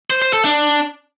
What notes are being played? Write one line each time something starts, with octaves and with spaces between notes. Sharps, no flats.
C5
C5
A4
D4